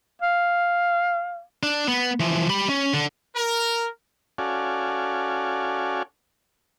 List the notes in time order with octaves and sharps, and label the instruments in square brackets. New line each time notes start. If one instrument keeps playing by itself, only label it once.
[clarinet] F5
[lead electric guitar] D4
B3
E3 F3
G4 B5
C#4
D3
[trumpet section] A#4
[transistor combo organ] C#4 F#4 A4 D5 F5 G#5